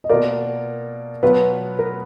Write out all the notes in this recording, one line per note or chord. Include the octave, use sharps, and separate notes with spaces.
D#5
B2 A#3 F4 A#4 D5
B2 F#3 B3 F4 B4
A#4